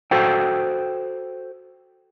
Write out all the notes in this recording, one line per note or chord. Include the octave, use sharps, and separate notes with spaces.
F#4 A4 C5 G5